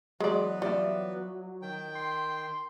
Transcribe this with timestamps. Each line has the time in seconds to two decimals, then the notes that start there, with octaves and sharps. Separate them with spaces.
0.20 E3 F#3 G#3 B3 B4 D5
0.62 G3 F4 D5 E5
1.62 D#3 G5
1.95 C6